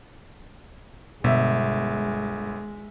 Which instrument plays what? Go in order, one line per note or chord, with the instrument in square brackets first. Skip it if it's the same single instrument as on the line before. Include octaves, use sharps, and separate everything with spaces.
[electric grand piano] G1 [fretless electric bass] B2 [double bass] G#3 [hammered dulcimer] E5